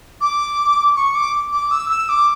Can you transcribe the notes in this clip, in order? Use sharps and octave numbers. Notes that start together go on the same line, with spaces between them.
D6
C#6
D6
D6
E6
E6
D6